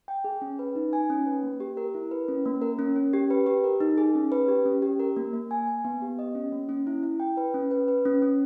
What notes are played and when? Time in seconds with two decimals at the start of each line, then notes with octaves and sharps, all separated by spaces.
0.08 G5
0.24 G#4
0.42 C#4
0.59 B4
0.75 D#4
0.93 G#5
1.10 C#4
1.26 B4
1.43 A#3
1.60 G4
1.77 A#4
1.94 E4
2.11 B4
2.28 C#4
2.45 A#3
2.62 A#4
2.79 C#4
2.96 C#4
3.13 G4
3.30 B4
3.46 G4
3.64 A#4
3.81 D#4
3.98 G#4
4.15 C#4
4.32 B4
4.48 G4
4.66 C#4
4.82 G4
4.99 A#4
5.16 A#3
5.33 A#3
5.51 G#5
5.67 G#5
5.85 B3
6.02 G4
6.19 D#5
6.35 C#4
6.52 A#3
6.69 C#4
6.87 E4
7.03 E4
7.20 G5
7.37 B4
7.54 C#4
7.71 B4
7.88 B4
8.05 C#4
8.22 C#4